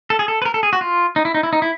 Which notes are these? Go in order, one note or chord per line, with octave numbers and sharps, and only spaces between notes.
A4
G#4
A4
B4
A#4
A4
G#4
F#4
F4
D#4
E4
D#4
E4
D#4
E4